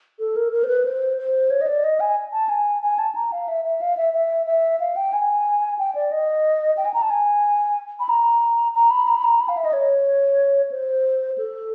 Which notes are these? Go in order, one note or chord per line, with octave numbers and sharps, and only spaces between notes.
A4
A#4
A#4
C5
B4
C5
C5
C#5
D#5
D5
D#5
G#5
A5
G#5
G#5
A5
A#5
F5
E5
E5
F5
E5
E5
E5
F5
G5
G#5
G5
D5
D#5
G5
G#5
A#5
A5
G#5
B5
A#5
A#5
B5
A#5
B5
A#5
B5
F5
E5
D#5
C#5
C5
A4